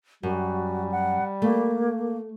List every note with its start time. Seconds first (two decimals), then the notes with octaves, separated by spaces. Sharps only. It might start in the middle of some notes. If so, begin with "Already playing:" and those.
0.23 F#2 G3 F#4
0.92 F#5
1.42 A3 A#3